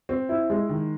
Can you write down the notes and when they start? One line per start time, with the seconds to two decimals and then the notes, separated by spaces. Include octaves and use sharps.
0.09 C4
0.29 E4
0.50 G#3
0.69 D#3